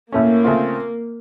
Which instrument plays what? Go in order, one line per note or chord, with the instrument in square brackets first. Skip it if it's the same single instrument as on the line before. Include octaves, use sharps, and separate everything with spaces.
[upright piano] A2 A3 C#4 [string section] A#3
[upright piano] C#3 A3 C4 F4